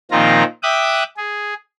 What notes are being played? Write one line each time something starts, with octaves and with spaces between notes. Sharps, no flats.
A#2 D#3 F3 C4 F4 A#5
E5 G5 D6 D#6 F#6
G#4